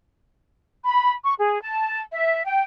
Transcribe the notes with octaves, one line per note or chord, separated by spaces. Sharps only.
B5
C#6
G#4
A5
E5
G5